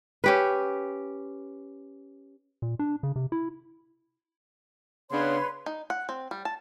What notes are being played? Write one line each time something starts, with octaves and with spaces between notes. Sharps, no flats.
C#4 G4 B4
A#2
D4
C#3
C3
E4
C#3 B3 D4 B4 C#5 C6
D#4
F#5
C4
G3
A5